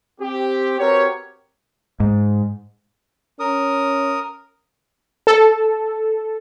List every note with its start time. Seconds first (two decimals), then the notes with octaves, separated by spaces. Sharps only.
0.21 C4 G4
0.79 C4 F#4 G4 A#4 B4 C#5
2.00 G#2
3.40 C#4 A#4 D#6
5.27 A4